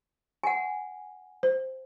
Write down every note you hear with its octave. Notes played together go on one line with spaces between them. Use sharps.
F#5 G#5
C5